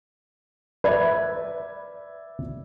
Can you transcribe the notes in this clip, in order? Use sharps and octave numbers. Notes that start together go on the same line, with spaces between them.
B4 D5 E5 G#6